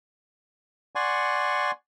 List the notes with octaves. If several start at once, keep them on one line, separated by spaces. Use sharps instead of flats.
D5 F#5 G#5 C6 C#6